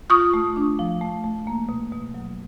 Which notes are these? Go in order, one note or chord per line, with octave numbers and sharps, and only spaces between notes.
F4 C#6 D#6
A3
D4
F3
A3
A3
A#3
B2
B2
F#3